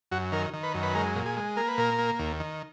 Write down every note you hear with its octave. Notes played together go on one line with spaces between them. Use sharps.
F#2 F#4
D#3 A#4
D#3
B4
F#2
B4
G#3 A#4
A#2
G#4
G#3
A#3 A#4
B4
A#2 A#4
A#3
D#2
D#3